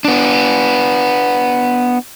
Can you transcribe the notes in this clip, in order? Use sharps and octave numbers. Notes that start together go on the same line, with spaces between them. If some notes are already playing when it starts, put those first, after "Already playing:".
B3 D4